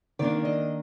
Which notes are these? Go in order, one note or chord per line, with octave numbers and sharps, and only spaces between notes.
D#3 A#3 D4 D5
D#5